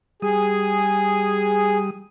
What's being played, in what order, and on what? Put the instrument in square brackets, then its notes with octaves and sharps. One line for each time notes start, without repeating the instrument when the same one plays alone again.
[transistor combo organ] G3 D#6 [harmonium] G#4